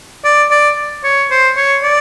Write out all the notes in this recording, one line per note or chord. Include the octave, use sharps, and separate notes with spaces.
D5
D5
C#5
C5
C#5
D5